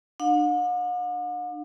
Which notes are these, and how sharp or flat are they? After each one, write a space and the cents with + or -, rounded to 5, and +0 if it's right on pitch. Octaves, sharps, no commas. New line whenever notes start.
D4 +35 F#5 -45